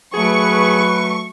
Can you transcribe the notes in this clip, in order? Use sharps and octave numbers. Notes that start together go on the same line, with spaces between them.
F#3 A3 G#4 B4 C#6